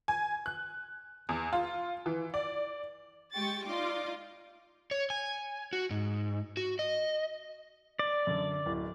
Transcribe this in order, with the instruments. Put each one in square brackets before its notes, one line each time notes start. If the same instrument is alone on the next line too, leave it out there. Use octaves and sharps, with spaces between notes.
[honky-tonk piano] G#5
F#6
E2
F4
E3
D5
[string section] G#3 G4 G5 C#6 A6
D#4 F4 D5 C6 D6
[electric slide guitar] C#5
G#5
F#4
G#2
F#4
D#5
[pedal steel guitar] D5
[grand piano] F#2 D3
D1